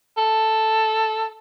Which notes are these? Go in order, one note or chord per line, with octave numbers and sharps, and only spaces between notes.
A4